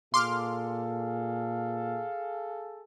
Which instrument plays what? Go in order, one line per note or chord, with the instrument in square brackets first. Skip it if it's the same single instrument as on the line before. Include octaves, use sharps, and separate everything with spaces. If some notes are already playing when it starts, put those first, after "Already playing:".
[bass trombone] A#2 [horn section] G#4 A4 [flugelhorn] F5 [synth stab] C6 D6 F6